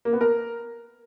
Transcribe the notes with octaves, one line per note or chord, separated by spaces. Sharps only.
A#3
B3
A#4